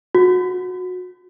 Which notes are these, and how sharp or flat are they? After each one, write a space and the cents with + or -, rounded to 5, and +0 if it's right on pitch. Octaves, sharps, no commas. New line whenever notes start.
F#4 -20